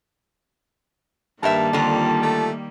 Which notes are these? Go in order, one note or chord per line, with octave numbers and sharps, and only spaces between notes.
G2 D#3 G3 A#3 A#4 E5 A5
F2 D3 F4
A3